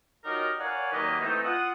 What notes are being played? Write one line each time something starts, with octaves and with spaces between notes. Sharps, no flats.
F#3 D#4 F4 G4 A#4
A#4 C#5 D5 F5 F#5 G#5
D#3 F#3 A#3 G4 B4 D#5
E3 A3 C4 D#4
F4 F#5 D#6